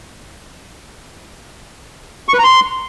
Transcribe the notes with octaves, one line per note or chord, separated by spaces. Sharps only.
C#6
B4
A#5
C6